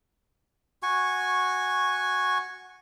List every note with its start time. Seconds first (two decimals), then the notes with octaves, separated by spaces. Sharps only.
0.83 F#4 G#5 C#6